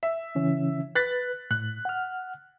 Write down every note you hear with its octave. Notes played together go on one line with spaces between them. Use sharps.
E5
C#3 E3 C#4
B4 F#6 A6 B6
A2 F#6
F#5 F6